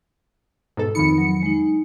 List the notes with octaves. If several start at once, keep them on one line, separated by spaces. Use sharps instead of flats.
G#2 B2 A4
F2 D#3 D#4 B5 C#7
F#3
G#3 D#4